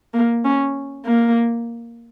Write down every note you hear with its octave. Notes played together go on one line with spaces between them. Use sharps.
A#3
C#4
A#3